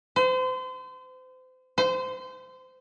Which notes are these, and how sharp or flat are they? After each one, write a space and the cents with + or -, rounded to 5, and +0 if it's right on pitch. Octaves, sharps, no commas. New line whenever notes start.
C5 -35
C5 -25